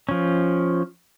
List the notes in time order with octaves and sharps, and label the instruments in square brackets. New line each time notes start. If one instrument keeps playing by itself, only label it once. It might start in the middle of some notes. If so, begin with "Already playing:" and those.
[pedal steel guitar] F3 C#4